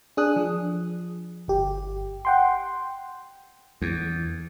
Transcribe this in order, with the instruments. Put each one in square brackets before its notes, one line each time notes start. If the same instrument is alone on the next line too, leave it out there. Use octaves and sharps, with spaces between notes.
[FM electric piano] D4 G#4 D#6 F#6
F3
G1 G4
F#5 G5 C6
[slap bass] E2